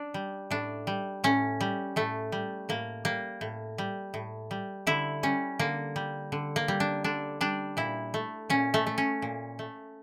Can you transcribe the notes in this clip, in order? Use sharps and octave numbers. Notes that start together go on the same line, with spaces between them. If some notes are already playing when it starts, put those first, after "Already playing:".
Already playing: D4
G3
A2 D4
G3
A2 C#4
G3
A2 A3
G3
A2 A#3
G3 A#3
A2
G3
A2
G3
D3 E4
G3 C#4
D3 A#3
G3
D3
A#3
G3
D4
D3 D4
G3 D4
A#2 E4
A3
A#2 C#4
A3
A3
C#4
A#2
A3